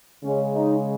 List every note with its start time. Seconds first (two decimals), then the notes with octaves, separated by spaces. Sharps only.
0.24 C#3 G#3 C#4
0.54 D#4